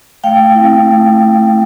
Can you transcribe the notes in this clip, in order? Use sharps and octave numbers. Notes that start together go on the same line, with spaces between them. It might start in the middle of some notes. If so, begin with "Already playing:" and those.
A3 F5 G5
C4 E4
A3